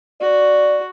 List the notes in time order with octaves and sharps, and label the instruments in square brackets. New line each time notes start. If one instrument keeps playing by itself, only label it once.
[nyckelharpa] F#4 [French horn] D5